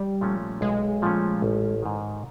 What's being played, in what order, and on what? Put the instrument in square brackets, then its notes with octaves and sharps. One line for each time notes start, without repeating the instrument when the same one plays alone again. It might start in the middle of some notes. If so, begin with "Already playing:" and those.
Already playing: [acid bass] G3
[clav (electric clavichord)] A#2 F3 A3 C#4
[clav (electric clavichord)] B1 [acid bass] G#3
[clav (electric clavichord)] A#2 F3 A3 C#4
A1
G#2 D#3